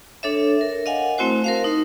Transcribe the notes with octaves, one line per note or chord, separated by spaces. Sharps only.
D4 A4 C#5 E5
A#4
D#5 F5 F#5 G#5
A3 C4 E4 F#4 C5
A#4 C5 F5
D#4